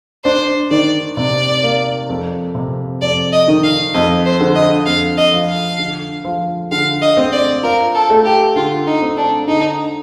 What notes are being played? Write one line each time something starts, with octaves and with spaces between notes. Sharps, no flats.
D4 C5
D#3 D5
C3 D5
A#3
F2
C3
F2 D5
D#5
D#3
F5
F2 D#5
C5
D3
D#5
F2 F5
D#5
F3
F5
D3
F3
D3 F5
D#5
C4
D5
F4 A#4
A4
A3
G4
D3 F4
D#4
C4
D4
D3 D#4